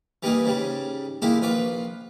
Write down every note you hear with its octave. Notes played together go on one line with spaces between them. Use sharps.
E3 G3 A#3 D#4
G#2 C#3 G3
G#3 A#3 E4 G4
A#1 F4 B4 D6